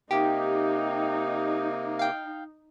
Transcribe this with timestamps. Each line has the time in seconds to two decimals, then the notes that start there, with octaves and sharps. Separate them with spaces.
0.11 C3 A#3 D#4 G4
1.99 F5 G5